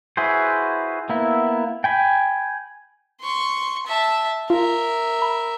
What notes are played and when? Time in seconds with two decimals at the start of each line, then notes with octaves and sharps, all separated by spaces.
0.17 E4 F#4 G#4 B4 C5
1.09 A#3 B3 E4
1.84 G5 G#5 B5
3.21 C6 C#6
3.87 E5 A5
4.50 F4 A#4 E5
5.22 B5